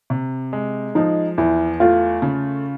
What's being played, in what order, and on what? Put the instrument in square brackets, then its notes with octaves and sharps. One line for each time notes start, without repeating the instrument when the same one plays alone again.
[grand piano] C3
G#3
[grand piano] F3 [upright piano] D#4
[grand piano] E2 [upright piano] E4
[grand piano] A3 [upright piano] F4
[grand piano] C#3